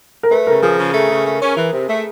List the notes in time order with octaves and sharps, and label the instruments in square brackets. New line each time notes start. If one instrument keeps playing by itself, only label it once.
[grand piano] A#4
[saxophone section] A3 [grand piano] B4
[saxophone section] C#3 [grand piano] A#4
[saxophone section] F3 [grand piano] G#4
[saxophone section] C#3
A3
C#3
A3
C#4
E3
C3
A3